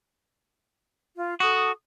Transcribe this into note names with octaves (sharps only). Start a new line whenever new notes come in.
F4
F#4 A4 D#6